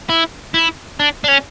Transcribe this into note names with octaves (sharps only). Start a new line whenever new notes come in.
E4
E4
D4
D4
C#4